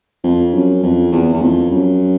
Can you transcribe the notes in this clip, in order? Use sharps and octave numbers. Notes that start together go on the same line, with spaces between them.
F2
F#2
F2
E2
E2
F2
F#2